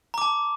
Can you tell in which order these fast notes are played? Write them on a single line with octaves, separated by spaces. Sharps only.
A#5 D6 A5